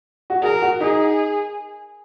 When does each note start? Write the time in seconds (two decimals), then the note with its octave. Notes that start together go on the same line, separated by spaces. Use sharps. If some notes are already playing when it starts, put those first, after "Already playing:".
0.30 F#4
0.42 G#4 A#4
0.62 F#4
0.80 D#4 G#4